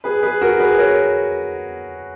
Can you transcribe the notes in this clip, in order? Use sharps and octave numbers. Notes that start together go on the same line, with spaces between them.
G#4 B4
G#4 B4
F#4 A#4
G#4 B4
A#4 C#5